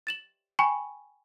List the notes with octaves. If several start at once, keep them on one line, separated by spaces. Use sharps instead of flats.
A6 E7 F#7
G5 G#5 B5 C#6